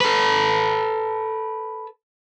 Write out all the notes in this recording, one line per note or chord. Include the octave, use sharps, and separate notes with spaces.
A4 B4